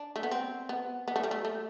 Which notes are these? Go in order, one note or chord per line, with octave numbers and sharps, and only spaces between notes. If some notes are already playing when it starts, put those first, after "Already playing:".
Already playing: D4
A3
B3
C4
B3
B3
A3
G3
A3
A3